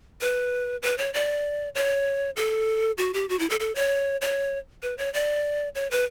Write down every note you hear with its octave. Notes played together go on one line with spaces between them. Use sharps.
B4
B4
C#5
D5
C#5
A4
F#4
G4
F#4
E4
A4
A4
C#5
C#5
B4
C#5
D5
C#5
B4